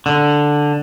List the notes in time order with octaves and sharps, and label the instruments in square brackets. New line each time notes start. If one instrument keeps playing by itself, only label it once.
[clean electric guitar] D3